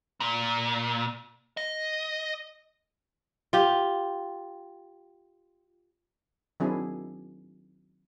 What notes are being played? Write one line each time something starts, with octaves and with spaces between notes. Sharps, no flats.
A#2
D#5
F4 G4
D#3 F#3 C4 D4 E4 G#4